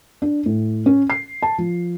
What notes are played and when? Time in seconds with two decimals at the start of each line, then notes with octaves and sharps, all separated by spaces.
0.22 D4
0.46 A2
0.86 C#4
1.10 C7
1.42 A5
1.58 F3